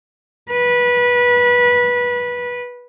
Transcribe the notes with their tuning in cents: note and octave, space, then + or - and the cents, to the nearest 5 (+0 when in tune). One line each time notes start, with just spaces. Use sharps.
B4 -20